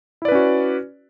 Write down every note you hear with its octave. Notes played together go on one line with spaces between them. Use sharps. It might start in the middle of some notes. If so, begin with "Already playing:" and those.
C#4 E4 F#4 B4 D5